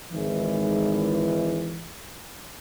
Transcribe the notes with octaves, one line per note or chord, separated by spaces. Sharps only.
G#1 G#2 E3